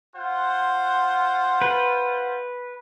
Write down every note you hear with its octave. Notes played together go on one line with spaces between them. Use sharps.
F4 C5 F#5
B4